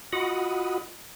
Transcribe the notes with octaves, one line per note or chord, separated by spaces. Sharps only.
F4 F#4 D#5 F#5 B5 D#6